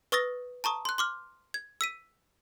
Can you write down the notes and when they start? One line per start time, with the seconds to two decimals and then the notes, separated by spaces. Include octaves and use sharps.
0.12 B4 C#6 D#6 E6 A6 A#6
0.64 A5 A#5 C#6 D#6
0.85 C6 F#6
0.98 C6 D6 F6
1.54 G#6
1.81 E6 B6 D#7